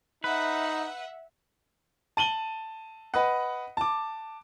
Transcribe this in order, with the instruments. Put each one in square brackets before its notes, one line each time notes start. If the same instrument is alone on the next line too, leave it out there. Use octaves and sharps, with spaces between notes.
[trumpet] D#4 [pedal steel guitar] B4 [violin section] E5 F#5
[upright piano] A5 D#7 F#7 G7
B4 D#5 F#5
A5 D6